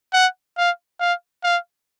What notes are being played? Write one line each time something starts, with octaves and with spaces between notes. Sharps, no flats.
F#5
F5
F5
F5